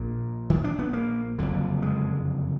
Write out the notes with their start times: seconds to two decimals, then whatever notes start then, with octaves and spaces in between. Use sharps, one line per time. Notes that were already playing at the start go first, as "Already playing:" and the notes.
Already playing: A#1 A#2
0.50 D#3
0.64 D4
0.79 B3
0.93 A#3
1.38 F#1 F2 D3
1.82 G#3